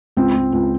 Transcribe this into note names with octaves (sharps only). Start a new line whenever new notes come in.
C#2 C4
C#2
C#2